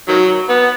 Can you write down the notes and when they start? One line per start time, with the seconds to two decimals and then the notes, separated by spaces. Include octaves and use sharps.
0.08 D#3 F#3
0.50 B3